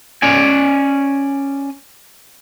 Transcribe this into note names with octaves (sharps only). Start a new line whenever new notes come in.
C#4 D5 G#5